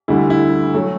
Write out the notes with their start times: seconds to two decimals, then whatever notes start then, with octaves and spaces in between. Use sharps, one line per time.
0.08 D2 D3 G3 E4
0.30 E4
0.74 F#3 A3